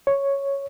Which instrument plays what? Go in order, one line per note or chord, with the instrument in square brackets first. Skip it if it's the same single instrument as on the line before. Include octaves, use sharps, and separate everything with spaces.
[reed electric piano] C#5